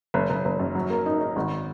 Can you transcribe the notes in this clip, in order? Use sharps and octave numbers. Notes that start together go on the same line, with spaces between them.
F#1
F#1
F#1
F#2
F#3
A#3
D#4
D#4
G#1